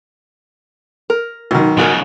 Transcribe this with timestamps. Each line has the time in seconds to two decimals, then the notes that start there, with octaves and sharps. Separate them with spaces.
1.10 A#4
1.51 B1 D#3
1.77 G#2 C#3 F4 F#4 A#4